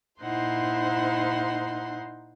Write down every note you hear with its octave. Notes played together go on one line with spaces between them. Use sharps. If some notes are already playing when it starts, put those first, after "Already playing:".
A#2 D#4 E4 C5 F#5 C6